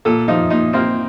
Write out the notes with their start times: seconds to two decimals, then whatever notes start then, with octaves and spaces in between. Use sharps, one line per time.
0.05 A#2 A4
0.28 F3 D#4
0.50 A#2 D#4
0.73 A#3 C4